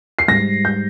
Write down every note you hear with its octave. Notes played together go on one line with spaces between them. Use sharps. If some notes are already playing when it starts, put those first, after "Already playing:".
C7
G#2 G3 A#6
G6